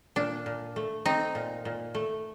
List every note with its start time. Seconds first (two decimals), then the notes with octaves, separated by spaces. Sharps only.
0.16 A#2 D4
0.46 A#2
0.76 A3
1.06 C4 D#4
1.35 A#2
1.65 A#2
1.95 A3